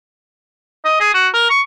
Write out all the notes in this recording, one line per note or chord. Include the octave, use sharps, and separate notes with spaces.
D#5
G#4
F#4
A#4
C#6